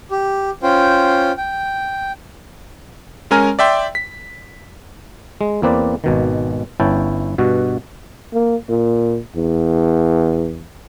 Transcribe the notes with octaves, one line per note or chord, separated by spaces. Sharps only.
G4
C#4 F4 C5 G5
G5
G#3 C#4 A#4 G#5 A#5 F6
D5 E5 G5 C6
B6
G#3
E2 A#3 C4 B4 D5
G#1 B2 D#3
G1 C#4 E4 B4 G5 A5
G2 B2 F#4
A#3
A#2
E2